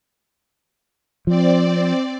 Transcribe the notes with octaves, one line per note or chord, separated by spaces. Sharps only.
F3 C4 D5